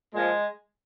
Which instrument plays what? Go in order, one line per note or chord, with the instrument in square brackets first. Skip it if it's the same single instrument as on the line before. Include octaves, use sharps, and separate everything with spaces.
[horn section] A#2 F3 G#3